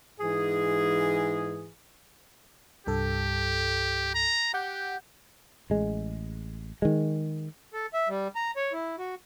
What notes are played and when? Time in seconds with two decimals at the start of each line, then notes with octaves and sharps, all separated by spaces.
0.20 G#2 E3 G#4
2.87 C2 G2 G4 A4
4.15 A#5
4.54 G4 F#5 D6 G6
5.70 A1 G#3
6.82 D#3 G#3
7.73 A4
7.94 E5
8.09 G3
8.35 A#5
8.56 C#5
8.73 E4
8.99 F#4